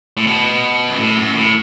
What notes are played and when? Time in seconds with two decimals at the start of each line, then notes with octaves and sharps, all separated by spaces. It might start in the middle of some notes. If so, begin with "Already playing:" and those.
0.17 A2
0.27 B2
0.90 F#2
0.98 A2
1.16 F#2
1.35 A2